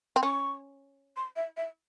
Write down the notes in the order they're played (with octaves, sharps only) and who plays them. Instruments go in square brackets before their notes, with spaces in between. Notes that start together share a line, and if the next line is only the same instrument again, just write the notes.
[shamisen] C4
[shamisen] C#4 [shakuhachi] C#6
[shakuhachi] C6
E5
E5